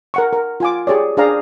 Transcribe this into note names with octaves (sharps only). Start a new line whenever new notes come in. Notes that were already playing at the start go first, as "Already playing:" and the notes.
A#4 F#5 C#6
A#4
F4 G#5 D6
G4 G#4 C#5 D5
D4 G#4 C5 D5 F5 A#5